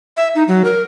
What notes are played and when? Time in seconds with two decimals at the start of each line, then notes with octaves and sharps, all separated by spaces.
0.17 E5
0.35 D#4
0.48 F#3
0.65 A#4